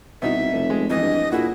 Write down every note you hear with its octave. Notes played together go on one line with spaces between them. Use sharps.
C2 B2 D#4 E5
F1
G#3
F2 E3 D#5
G2
A#2 E4 F#4 G#4